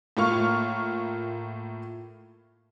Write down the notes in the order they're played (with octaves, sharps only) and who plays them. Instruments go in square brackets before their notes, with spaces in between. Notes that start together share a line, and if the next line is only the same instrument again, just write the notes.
[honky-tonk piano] A2 A#3 F4 C#6 F6